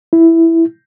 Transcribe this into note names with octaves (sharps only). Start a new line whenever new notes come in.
E4